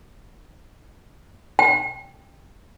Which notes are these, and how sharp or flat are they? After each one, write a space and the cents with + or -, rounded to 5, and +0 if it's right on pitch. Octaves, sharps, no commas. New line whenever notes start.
G5 +10